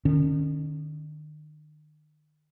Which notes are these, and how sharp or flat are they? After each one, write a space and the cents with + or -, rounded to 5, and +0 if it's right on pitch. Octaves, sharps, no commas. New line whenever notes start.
D#3 -40 C#4 +0